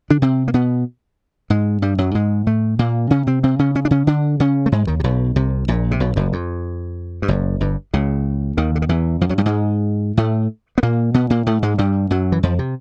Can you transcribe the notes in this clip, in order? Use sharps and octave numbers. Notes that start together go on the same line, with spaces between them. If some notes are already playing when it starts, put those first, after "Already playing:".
D3 D4
C3 C4
A#3
B2 B3
G#2 G#3
G2 G3
F#2 F#3
G#2 G#3
A2 A3
A#2 A#3
C#3 C#4
C3 C4
C3 C4
C#3 C#4
C#3 C#4
D4
C#3 C#4
D3 D4
C#3 C#4
A3
G#2 G#3
D#2 D#3
C3
B1 B2
C2 C3
A#1 A#2
C3
B1 B2
F#1 F#2
F2
G2
F#1 F#2
G1 G2
C#2 C#3
D#2 D#3
D3
D#3
E2 E3
F2 F3
F#2 F#3
G2 G3
G#2 G#3
A2 A3
B3
A#2 A#3
B2 B3
A#2 A#3
A2 A3
G#2 G#3
G2 G3
F#2 F#3
E3
F2 F3
C3